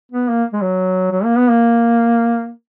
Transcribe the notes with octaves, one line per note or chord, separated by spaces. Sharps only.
B3
A#3
G#3
F#3
F#3
A#3
B3
A#3